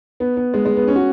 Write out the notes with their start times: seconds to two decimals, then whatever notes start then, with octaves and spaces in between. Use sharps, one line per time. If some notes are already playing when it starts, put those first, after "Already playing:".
0.20 B3
0.37 B3
0.54 G#3
0.65 G#3
0.77 B3
0.88 C#4
0.96 F#4